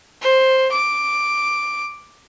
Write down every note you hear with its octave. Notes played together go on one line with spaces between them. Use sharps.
C5
D6